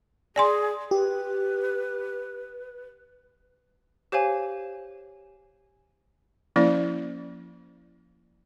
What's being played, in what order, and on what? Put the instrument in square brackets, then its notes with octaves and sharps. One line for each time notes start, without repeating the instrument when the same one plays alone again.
[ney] G#4 [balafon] D5 G#5 C6
[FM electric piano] G4 [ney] B4
[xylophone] G4 C5 C#5 F5 G#5
[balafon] F3 A#3 C#4 E4 D5